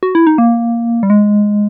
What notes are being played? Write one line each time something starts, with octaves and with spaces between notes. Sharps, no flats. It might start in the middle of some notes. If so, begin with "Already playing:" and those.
F#4
E4
D#4
A#3
G3
G#3